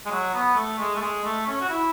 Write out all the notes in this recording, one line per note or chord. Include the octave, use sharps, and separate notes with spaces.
G#3
F#3
B3
A3
G#3
A3
G#3
A3
C#4
F#4
E4